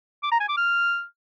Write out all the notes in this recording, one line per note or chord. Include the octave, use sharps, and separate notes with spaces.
D6
A#5
G#5
D6
F6